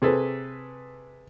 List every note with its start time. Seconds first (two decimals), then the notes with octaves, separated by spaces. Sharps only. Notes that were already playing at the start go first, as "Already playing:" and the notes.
0.02 C3 G#4 A4 B4